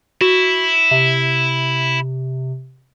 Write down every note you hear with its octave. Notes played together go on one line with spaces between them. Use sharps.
E4 F#4
C3